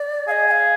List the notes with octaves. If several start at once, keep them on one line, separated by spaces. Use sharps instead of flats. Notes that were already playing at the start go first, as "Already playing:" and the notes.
Already playing: D5
G#4 D#5 F5
G#5
F5